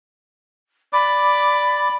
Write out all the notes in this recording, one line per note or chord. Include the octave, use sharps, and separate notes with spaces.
D5 B5 D6